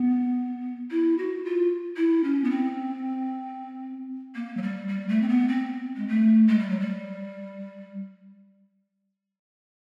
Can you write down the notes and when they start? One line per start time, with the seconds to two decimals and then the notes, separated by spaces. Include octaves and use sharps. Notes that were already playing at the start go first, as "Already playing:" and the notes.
Already playing: B3
0.91 E4
1.18 F#4
1.45 F4
1.97 E4
2.24 C#4
2.44 B3
2.50 C4
4.35 A#3
4.57 F#3
4.62 G3
4.88 G3
5.09 A3
5.22 C4
5.28 B3
5.48 C4
5.96 G#3
6.08 A3
6.48 G#3
6.59 G3
6.69 F#3
6.80 G3